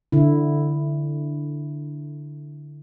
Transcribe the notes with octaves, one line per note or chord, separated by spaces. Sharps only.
D3 E4